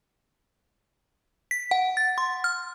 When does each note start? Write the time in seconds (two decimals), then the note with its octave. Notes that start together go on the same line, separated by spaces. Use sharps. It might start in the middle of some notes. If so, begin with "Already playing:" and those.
1.51 B6
1.71 F#5
1.97 A6
2.18 C6
2.44 F6